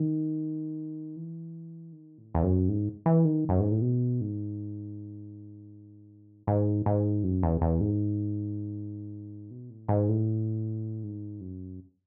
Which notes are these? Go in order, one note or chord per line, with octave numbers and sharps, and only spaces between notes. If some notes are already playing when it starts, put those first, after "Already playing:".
Already playing: D#3
E3
D#3
A2
E2
F#2
G#2
E3
D#3
F#2
G#2
A2
B2
G#2
G#2
G#2
F#2
E2
E2
G#2
B2
A2
G#2
A2
G#2
F#2